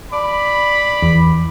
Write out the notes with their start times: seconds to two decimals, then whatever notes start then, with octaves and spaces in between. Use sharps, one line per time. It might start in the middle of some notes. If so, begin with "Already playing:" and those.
0.12 D5 B5
1.02 E2